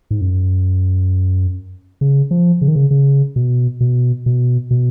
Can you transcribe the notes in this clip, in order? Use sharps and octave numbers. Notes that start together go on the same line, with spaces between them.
G#2
F#2
C#3
F3
C#3
D#3
C#3
C#3
B2
B2
B2
B2